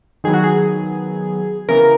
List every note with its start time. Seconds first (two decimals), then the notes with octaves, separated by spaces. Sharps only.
0.24 D#3 F#3 B3 G#4
0.34 F#4
0.44 G#4
1.69 C#3 E3 B3 A#4